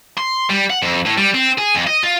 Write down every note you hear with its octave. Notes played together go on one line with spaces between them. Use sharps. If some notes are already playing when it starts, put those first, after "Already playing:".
C6
G3
F#5
F2
A2
G3
C4
G#4
F2
D#5
F4